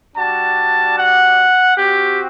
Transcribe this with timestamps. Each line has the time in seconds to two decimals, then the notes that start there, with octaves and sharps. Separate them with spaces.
0.16 G3 D4 F#4 A5
0.97 F#5
1.77 C4 F#4 G4